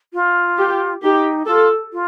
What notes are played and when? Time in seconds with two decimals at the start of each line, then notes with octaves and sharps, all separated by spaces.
0.13 F4
0.58 G4
1.02 D#4 G4
1.47 F4 A4
1.93 F4